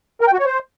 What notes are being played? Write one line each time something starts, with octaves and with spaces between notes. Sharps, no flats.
A#4
G5
F#4
C#5
C5